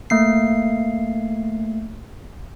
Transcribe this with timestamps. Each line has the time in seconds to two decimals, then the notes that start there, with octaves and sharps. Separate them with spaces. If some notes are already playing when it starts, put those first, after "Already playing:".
0.10 A3 A#3 C7